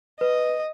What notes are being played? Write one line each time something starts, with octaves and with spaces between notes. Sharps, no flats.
B4 D#5